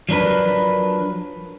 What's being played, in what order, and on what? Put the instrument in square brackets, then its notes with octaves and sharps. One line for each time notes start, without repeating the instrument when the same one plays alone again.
[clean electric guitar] F3 F#3 D4 A#4 B4